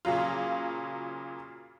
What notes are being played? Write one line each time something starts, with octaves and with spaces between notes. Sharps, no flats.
A#2 C#3 F#3 F4